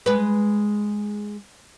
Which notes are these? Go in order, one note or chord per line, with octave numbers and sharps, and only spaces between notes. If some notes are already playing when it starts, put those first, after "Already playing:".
G#3 B4